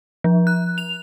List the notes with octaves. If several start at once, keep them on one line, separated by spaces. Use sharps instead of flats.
F3
F#6
F7